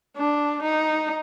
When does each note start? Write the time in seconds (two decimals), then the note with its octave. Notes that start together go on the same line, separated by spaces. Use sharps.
0.17 D4
0.63 D#4